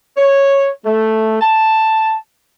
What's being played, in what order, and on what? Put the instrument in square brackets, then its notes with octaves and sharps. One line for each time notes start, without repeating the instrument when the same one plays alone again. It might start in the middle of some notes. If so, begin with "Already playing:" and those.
[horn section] C#5
A3
A5